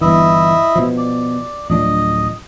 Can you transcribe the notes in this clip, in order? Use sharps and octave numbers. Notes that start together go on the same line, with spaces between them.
G1 E3 E4 D#5 E5
B2 F3
D5
D1 F3 D4 D#5